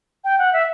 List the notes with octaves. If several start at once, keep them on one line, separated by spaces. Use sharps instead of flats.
G5
F#5
E5